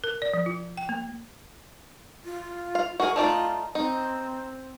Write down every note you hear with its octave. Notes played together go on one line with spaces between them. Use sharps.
A#4
D5
F3
F4
G5
A#3
F4
F5
F#4 G#4 A#4
A3 D#4 F4 D5
C4 D#4